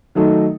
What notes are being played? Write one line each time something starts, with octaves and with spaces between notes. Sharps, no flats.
D#3 F#3 A3 D#4 A4